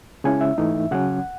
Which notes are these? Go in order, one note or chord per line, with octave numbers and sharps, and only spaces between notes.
C#3 G#3 C#4 E4 G#5
E5
G#2 E3 A3 D#4
C#3 F#3 C#4 F#5